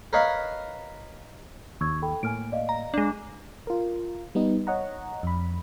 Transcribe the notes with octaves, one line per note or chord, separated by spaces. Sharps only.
A#4 B4 C#5 D#5 F5 B5
D#2 C#6 E6 G#6
A4 G5 B5
A2 A#3 G#5 F6 D7
D5 D#5 F5
A#5
G#3 D4
F4 A#4
G3 B3 D#4
C#5 D#5 F#5 A#5
F2 B5